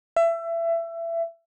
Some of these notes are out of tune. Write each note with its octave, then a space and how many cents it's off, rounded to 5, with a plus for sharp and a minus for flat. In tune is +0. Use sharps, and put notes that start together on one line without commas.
E5 +25